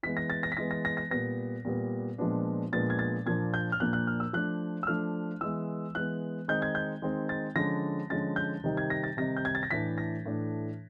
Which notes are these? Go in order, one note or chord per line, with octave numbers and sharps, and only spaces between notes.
E3 G#3 B3 B6
A#6
A6
A#6
B6
E3 G#3 B3 A#6
A#6
A#6
A#6
A#2 G3 B3 A#6
A#2 G3 B3
A#2 F3 G#3 B3 D4
A#2 F3 G#3 B3 D4 A6
G#6
A6
A#2 F3 A#3 D4 G#6
G6
F6
A#2 F3 A#3 D4 F#6
F#6
F6
E6
F3 A3 D4 F#6
E6
F3 A3 D4 F6
E3 G#3 B3 E6
E3 G#3 B3 F#6
D#3 G#3 C4 D#4 G6
G#6
G6
D#3 G#3 C4 D#4
A6
D3 F3 G#3 C#4 A#6
D3 F3 G#3 C#4 A6
G6
C3 D#3 G3 C4 D#4
G#6
A#6
A6
C3 D#3 G3 C4 D#4 A#6
G6
G#6
A6
A#6
A2 E3 A3 D4 B6
A#6
A2 E3 A3 D4